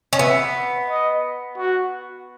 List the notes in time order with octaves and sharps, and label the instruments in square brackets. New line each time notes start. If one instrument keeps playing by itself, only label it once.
[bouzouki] C#4
[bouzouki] B3 [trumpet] E5
[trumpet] D#5
F#4